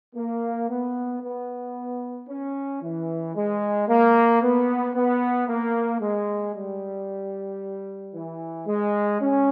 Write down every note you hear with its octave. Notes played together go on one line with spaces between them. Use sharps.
A#3
B3
B3
C#4
E3
G#3
A#3
B3
B3
A#3
G#3
G3
E3
G#3
C#4